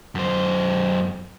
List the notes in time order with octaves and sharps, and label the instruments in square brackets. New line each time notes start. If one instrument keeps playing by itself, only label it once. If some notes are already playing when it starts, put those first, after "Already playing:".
[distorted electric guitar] F#2 C5